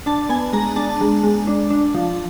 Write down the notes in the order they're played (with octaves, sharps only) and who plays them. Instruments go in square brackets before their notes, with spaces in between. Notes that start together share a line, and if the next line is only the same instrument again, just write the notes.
[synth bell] D4 A5
B3 G#5
G#3 A#5
D4 A5
G#3
G#3
D4
D4
F3